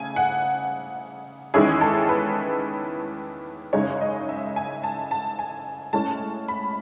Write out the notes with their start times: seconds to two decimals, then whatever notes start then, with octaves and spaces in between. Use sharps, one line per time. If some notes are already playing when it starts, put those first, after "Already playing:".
Already playing: C#3 A3 G#5
0.16 F#5
1.54 E2 D#3 G#3 C#4 E4 G#4
1.81 A4
2.09 B4
3.73 F#2 C#3 G#3 D#4 C#5
4.01 D#5
4.29 E5
4.56 G#5
4.84 A5
5.11 A5
5.39 G#5
5.93 A2 G#3 C#4 A5
6.48 B5